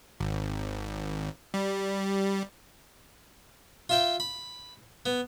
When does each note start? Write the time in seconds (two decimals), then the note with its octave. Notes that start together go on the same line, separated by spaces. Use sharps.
0.20 G#1
1.54 G3
3.89 F4 E5 G5
4.20 B5
5.06 B3